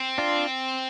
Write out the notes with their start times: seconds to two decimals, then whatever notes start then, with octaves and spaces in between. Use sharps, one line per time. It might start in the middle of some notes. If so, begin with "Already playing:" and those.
Already playing: C4
0.18 D4 F4